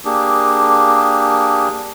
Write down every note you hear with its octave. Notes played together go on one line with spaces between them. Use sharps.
A#3 D4 G4 G#4